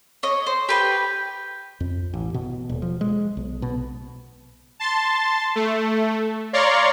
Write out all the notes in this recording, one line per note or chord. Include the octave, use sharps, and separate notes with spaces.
C#5 D#5
C5
G4 B4 G5
F2
A1
B2
D#1
F3
G#3
B1
B2
A5 C6 A6
A3
C#5 D5 F5 A#5 C6 C#6